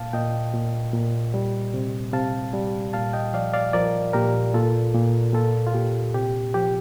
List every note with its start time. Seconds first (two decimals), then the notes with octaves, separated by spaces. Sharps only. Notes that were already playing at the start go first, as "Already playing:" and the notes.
Already playing: A#2 F5 A5
0.13 A#2 D#5 G5
0.54 A#2
0.93 A#2
1.34 G3
1.74 C3
2.13 C3 F5 A5
2.53 G3
2.93 A#2 F5 A5
3.13 D#5 G5
3.34 F3 D5 F5
3.54 D5 F5
3.73 F3 A#4 D5
4.13 A#2 G4 A#4
4.54 A#2 F4 A4
4.94 A#2
5.33 A#2 F4 A4
5.67 F4
5.73 A#2 G4
6.14 C3 G4
6.54 F3 G4